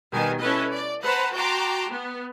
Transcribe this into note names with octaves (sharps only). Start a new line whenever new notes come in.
B2 D#3 G3 B3 G#5
C#4 E4 A4 B4 D#5
D5
B4 C5 F#5 A5 A#5
F#4 G5 A5 A#5 C6 D6
B3